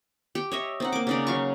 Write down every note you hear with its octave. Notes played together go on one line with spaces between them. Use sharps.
G4
C#5 D#5 E5
C4 D#4 F#5
A#3 D6
C#3 D#4 D5
F#3 F5 C#6